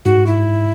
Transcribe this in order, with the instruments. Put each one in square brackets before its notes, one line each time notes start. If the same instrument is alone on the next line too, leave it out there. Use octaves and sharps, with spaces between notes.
[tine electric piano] G#2 [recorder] F#4
[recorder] E4